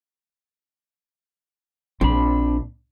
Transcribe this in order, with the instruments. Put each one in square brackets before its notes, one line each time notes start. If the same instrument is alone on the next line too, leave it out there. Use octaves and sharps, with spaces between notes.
[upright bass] A#1 [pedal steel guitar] C4 D4 B5